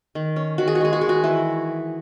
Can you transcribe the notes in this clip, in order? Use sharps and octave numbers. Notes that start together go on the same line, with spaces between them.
D#3
C#4
D#3 F#4
G#4
F#4
G#3 G#4
F#4
D#3 G#4
F#4
E3 E4